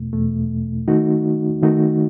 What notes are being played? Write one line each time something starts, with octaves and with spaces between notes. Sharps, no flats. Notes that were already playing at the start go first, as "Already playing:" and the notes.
Already playing: E2 B2 A3
E2 B2 A3
D#3 A3 D#4 F#4
D#3 A3 D#4 F#4